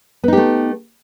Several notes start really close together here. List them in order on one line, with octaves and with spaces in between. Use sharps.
B3 D#4 G4 A3